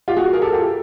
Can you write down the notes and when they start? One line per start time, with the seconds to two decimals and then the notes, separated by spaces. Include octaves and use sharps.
0.08 F4 G4
0.16 F#4 G#4
0.33 G#4 A#4
0.42 G4 A4
0.53 F4 G4